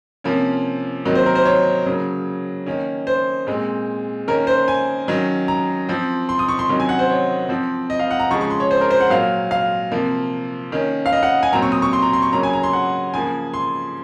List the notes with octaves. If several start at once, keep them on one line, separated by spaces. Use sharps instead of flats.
C3 F3 A#3 C#4
C3 D#3 F#3 A#3
C5
A#4
C5
C#5
C#3 F#3 A#3
D#3 A#3 C#4
C5
A#2 G#3 C4
D#3 A#3 C#4 A#4
C5
G#5
D#3 F#3 C#4
A#5
F3 C4
C6
D#6
C#6
C6
C3 D#3 F#3 C#4
G#5
F#5
C5
C#5
F3 C4
D#5
F5
F#5
A#5
C#3 F3 G#3 C#6
C#6
C6
C#5
C5
A#4
C5
F#5
A#2 F#3 A#3 F5
F5
C3 F3 A#3
D#3 A#3 C#4
F5
D#5
F#5
G#5
A#2 F#3 C4 A#5
C#6
D#6
C#6
C6
A#5
C6
C#6
C#3 F#3 A#3 C#4 A#5
G#5
A#5
C6
F#5
C#3 F3 A#3 G#5
C6